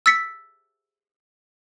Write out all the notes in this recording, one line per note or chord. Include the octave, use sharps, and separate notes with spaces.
E6 A6 B6 C#7